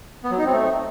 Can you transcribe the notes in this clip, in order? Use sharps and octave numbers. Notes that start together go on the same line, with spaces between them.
B3
F#3
D#4
C4
A3